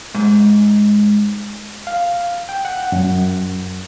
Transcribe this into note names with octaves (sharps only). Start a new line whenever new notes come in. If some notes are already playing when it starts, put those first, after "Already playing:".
G#2
F5
G5
F#5
F#2